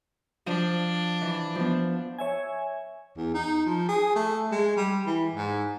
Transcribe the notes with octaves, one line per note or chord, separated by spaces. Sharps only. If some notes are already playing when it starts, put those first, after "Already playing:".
F3 D4
E3
F3 B3
C#5 E5 G#5
E2
D#4
F3
G#4
A3
G#3
G3
E3
G#2